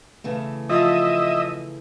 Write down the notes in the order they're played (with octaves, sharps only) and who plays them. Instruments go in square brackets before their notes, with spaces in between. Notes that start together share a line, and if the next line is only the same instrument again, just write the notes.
[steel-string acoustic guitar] C#3 E3 A3
[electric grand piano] F3 F4 D#6 [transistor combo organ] D#5 E5